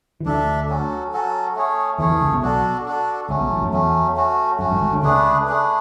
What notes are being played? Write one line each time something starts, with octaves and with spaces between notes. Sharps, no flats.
E3
D2 D3 D4 A4 E5
F#3 C#4 F#4 A4
F#3 C#4 F#4 A4
A3 C#4 G#4 C#5
E2 E3 A3 C#4 G#4 C#5
E2 E3
C#2 C#3
B1 B2
D4 F#4 A4
D4 F#4 A4
C#2 C#3 F#3 A3 C#4
B1 B2
A1 A2
F#2
E2 F#3 A3 C#4
A3 C#4 F#4
F#2 A3 C#4 F#4
G#1 G#2
G#1 G#2
D2 D3
C#2 C#3 A3 D4 G#4 B4
A3 D4 G#4 B4